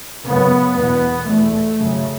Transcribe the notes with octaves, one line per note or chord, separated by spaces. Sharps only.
F#2 C#3 B3
E2 B2 B3
E2 B2 A3
F#2 C#3